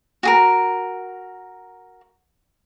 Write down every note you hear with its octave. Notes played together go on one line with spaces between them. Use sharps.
F#4 G#4 A#4